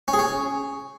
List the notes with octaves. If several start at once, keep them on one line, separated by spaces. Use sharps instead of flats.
C#4
G#4
C#4